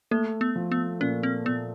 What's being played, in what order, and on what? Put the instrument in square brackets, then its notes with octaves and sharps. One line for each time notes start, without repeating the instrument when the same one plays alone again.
[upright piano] A3 [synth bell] A#3
[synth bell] B3
[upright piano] F3
[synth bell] B3
[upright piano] A#2 [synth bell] C#4
[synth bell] C4
[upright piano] A#2 [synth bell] B3